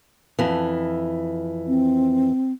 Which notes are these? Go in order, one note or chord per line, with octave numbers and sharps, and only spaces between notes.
F2 E3
C4